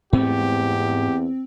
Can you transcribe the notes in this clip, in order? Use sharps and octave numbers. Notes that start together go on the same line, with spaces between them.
E2 G#2 A3 C4 G4